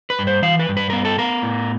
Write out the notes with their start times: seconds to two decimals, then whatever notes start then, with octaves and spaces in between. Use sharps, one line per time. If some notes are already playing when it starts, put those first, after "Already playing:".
0.10 B4
0.19 G2
0.27 C5
0.42 E3 F5
0.59 B4
0.69 G2
0.77 B4
0.90 B3 A#4
1.05 A4
1.18 B3 A#4
1.43 A2